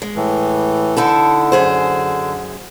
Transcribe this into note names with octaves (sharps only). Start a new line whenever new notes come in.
G#3
A2 E3
D3 D#4 E4 A4
F#2 G#4 C5